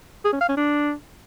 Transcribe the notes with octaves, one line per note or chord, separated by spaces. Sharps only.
G#4
C#4
F5
C#4
D4